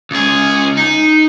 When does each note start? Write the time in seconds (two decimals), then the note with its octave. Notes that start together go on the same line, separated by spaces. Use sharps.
0.11 C#2 G#4
0.77 D#4